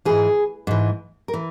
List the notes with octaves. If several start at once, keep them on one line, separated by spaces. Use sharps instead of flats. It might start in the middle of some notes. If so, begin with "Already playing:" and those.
G#2 E3 G#4
G#2 E3
A#4
E3